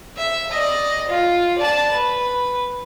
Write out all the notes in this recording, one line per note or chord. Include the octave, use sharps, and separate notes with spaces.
E5
D5 D#5
F4
D5 A5
B4